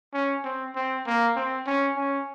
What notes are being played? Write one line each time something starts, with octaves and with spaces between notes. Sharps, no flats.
C#4
C4
C4
A#3
C4
C#4
C#4